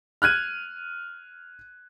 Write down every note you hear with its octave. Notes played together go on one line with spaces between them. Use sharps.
F6 F#6 G#6 D#7